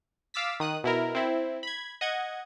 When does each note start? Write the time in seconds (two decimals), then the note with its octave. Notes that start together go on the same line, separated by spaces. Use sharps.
0.34 F5 D6 E6 A6 B6
0.60 D#3 D#6 F#6
0.84 B2 E4 A#4
1.15 C4 E4
1.63 B5 G#6
2.01 D#5 F#5 G#6